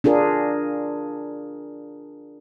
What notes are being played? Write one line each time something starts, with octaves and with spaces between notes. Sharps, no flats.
D4 F4 G#4 A#4